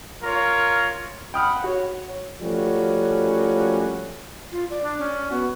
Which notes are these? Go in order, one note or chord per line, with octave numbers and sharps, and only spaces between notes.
F4 A#4 C#5
F#5 G5 B5 D#6 F6
F#4 C#5
F3 G3 A3 A#3 C#4 F#4
F4
D5
D4
C#4
B3 F#4